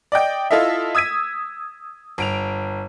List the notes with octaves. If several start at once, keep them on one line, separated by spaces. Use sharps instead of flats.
D5 D#5 G5
E4 F4 A4 D#5 E5
D#6 E6 G#6 B6 D#7
G1 D7 F7